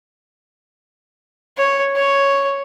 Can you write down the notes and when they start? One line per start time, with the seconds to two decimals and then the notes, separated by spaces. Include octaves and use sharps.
1.58 C#5
1.96 C#5